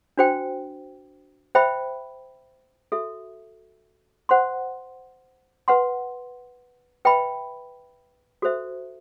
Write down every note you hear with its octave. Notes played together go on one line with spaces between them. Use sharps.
D4 F#4 C5 G5
C5 E5 G5 B5
F#4 A4 E5
C5 F#5 C6
B4 F#5 C6
B4 E5 G5 B5
F#4 A4 C5 E5